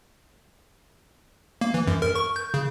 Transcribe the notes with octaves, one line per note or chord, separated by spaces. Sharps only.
A#3
E3
F#2
A#4
C#6
G6
C#3